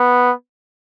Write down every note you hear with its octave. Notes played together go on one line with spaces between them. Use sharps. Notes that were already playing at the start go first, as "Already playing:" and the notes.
Already playing: B3